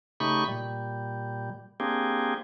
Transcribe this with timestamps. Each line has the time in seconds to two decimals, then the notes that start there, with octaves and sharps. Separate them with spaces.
0.20 C#3 A3 D#4 G4 B5 C#6
0.48 A#2 G3
1.80 A#3 C4 D4 G4 G#4